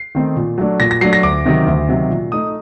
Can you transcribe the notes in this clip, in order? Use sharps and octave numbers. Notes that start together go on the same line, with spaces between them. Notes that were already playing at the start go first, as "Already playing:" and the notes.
Already playing: C7
D#3 A3 C4 D#4
A#2
F#3 A3 D4
A#2 A#6
A#6
F#3 A3 D4 C7
A#6
D2 D6
C3 D#3 F#3
D2
C3 D#3 F#3
A#2
A3 D#4 D#6